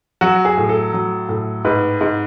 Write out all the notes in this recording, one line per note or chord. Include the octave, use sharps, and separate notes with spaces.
F#3 F#4
G#4
A2
A4
F#3
A2
G#2 B4
G#2